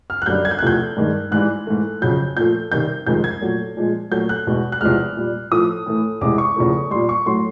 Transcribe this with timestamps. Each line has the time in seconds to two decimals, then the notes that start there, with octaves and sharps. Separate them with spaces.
0.10 F6
0.22 F#6
0.26 F#2 D3 G3 G6
0.45 G#6
0.51 G6
0.59 F#6
0.62 E2 C3 F3 A3 G6
0.97 G2 D#3 G#3
1.32 G#2 E3 G3 F#6
1.67 G#2 E3 A3
2.02 F2 C#3 F#3 G6
2.36 A#2 F3 A3 G6
2.72 C3 D#3 G3 G6
3.06 F2 C3 D#3 G#3 G6
3.24 G#6
3.41 A#2 F#3 A3
3.77 A#2 F3 G#3
4.11 A#2 F#3 A3 G6
4.29 F#6
4.47 E2 B2 G#3
4.72 F#6
4.81 E2 C3 F3 G#3 F6
5.17 A#2 G3
5.51 A2 F3 A3 D#6
5.86 A2 E3 A3
6.21 E2 C3 E3 G#3 D6
6.38 C#6
6.56 E2 C#3 F3 A3
6.91 A#2 G3 C6
7.09 C#6
7.26 A2 F#3 A3 C6